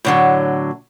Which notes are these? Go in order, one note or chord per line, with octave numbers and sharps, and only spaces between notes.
A2 D3 F#3